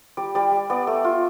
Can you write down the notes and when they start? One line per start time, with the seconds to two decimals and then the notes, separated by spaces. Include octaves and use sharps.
0.17 G3 D5
0.35 G3 D5
0.52 G3
0.70 B3 D5
0.87 A3
1.04 F4